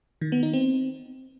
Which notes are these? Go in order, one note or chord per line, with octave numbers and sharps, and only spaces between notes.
D#3
B3
D#4
C4